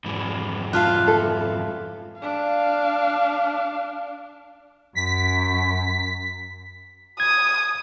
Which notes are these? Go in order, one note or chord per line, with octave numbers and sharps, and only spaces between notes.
F2 G#2 E3
F4 E5 F5 A5 F6 F#6
A4
D4 F5
F#2 B6
D#6 G#6